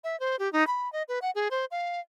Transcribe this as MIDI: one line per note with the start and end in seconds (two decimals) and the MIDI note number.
0.04 0.19 76
0.20 0.36 72
0.39 0.51 67
0.53 0.66 63
0.67 0.91 83
0.93 1.03 75
1.08 1.19 71
1.22 1.31 78
1.35 1.48 68
1.51 1.65 72
1.71 2.00 77